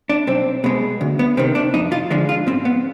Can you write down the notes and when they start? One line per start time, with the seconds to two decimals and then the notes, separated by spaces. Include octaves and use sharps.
0.09 D4
0.27 B1 C4
0.64 B2 G#3
1.01 D2
1.19 B3
1.37 C3 D#3 C4
1.55 D4
1.74 F2 D#4
1.92 F4
2.11 D3 F3 G#3
2.29 F4
2.47 G#2 C4
2.65 B3